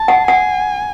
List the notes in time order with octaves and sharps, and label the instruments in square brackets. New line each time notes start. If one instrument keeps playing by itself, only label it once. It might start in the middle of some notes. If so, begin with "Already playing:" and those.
Already playing: [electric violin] A5
[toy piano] F#5
[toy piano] F#5 [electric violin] G#5